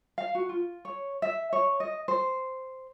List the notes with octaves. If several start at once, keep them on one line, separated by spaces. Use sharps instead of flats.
F5
F#4
F4
C#5
E5
C#5
D#5
C5